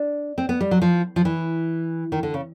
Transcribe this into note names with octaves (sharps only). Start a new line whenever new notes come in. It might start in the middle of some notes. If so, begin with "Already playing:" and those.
Already playing: D4
C4
B3
G3
F#3
F3
F3
E3
D#3
D3
C#3